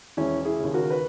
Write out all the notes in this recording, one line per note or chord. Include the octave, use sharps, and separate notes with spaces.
E1 C#4 E4
E4 G#4
D#2 C#3
F#4 A#4
B4